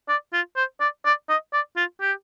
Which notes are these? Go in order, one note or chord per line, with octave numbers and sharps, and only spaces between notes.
D5
F4
C5
D5
D5
D#5
D5
F4
G4